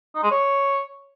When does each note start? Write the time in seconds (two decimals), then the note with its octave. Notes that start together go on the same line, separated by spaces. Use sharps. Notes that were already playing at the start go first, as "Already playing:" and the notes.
0.15 D#4
0.23 G#3
0.31 C#5